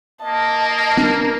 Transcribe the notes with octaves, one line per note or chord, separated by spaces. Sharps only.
A#3 D#5 A5
B3 D4 A#4